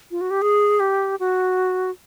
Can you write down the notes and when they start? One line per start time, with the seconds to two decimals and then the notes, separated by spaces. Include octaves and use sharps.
0.11 F4
0.21 F#4
0.30 G4
0.42 G#4
0.80 G4
1.20 F#4